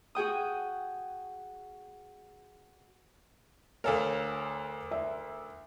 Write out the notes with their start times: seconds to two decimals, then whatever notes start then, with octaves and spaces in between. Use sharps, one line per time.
0.15 F#4 G#4 G5 D#6
3.84 D2 A4 A#4 C#5 F5 G#5
4.91 E5